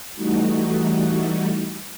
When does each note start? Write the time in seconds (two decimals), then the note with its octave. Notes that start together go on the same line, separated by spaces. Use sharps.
0.15 E3 G3 A3 D#4 F#4